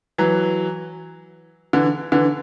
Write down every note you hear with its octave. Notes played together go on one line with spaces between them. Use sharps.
E3 F#3
D3 E3
D3 E3